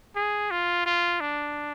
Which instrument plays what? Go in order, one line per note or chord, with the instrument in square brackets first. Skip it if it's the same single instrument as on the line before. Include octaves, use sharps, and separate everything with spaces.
[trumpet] G#4
F4
F4
D4